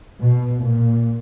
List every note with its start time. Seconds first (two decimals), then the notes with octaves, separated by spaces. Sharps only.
0.19 B2
0.60 A#2